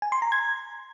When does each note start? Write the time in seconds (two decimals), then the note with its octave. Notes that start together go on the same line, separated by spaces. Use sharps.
0.02 G#5
0.12 C6
0.22 A#5
0.32 G#6